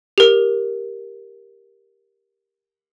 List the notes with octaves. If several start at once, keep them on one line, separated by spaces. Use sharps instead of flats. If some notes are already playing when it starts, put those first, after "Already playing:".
G4 A#4